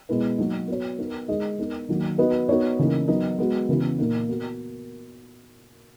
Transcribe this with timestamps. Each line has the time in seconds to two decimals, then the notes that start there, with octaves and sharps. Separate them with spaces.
0.09 B2 G#3 B3 E4 B4
0.38 F#3 A#3 D#4
0.68 B3 F#4 C#5
0.98 B3 D#4 A#4
1.28 G#3 D#4 G#4 D#5
1.59 B3 D#4 A#4
1.88 D#3 F#3 A#3
2.18 B3 D#4 F#4 B4 D#5
2.49 B3 D#4 F#4 C#5
2.79 C#3 E3 A#3 D#4 A#4
3.08 F#3 B3 D#4
3.38 G#3 B3 F#4
3.69 C#3 E3 B3 F#4
3.99 A#2 A#3 D#4 A#4
4.28 B3 F#4 A#4